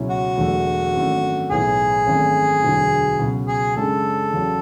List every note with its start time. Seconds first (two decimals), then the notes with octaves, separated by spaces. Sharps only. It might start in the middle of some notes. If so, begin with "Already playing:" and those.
Already playing: C#2 B2 F#3 C#4 E4
0.10 F#4
0.38 E1 E2 D3 F#3 A3
0.95 G#1 F#2 E3 A3 D4
1.51 B1 A2 E3 B3 E4 G#4
2.07 G#1 F#2 E3 A3
2.64 E1 D2 D3 F#3
3.19 C#2 B2 F#3
3.47 G#4
3.76 F#1 F#2 C#3 G#3 D4 A4
4.33 E2 C#3 F#3